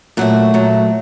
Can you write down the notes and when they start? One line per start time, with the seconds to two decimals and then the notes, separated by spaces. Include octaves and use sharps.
0.17 A#2 F#3 A3 F#4
0.54 A#2 F#3 A3